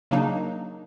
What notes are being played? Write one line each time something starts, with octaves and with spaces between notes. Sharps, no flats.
C#3 F#3 A#3 D4 D#4